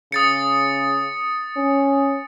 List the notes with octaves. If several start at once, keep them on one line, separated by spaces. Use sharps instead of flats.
C#3 D#6 A6 C#7
C#4